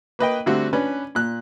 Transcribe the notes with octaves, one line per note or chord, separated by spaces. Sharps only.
A#3 B4 D#5 G5
D3 G3 A3 C4 F#4
C#4 D4 B4
A#2 F#6